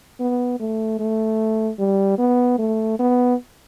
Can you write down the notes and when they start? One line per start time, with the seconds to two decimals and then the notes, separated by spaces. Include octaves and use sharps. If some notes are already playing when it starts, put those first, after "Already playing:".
0.20 B3
0.60 A3
0.99 A3
1.79 G3
2.18 B3
2.58 A3
2.99 B3